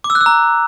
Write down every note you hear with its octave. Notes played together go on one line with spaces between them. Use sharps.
D6
E6
F#6
E6
A#5